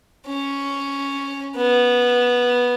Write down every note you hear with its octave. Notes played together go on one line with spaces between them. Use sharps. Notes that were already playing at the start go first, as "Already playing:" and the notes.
C#4
B3